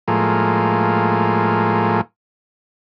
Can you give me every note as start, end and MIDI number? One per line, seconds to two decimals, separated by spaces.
0.08 2.01 45
0.08 2.01 53
0.08 2.01 56
0.08 2.01 58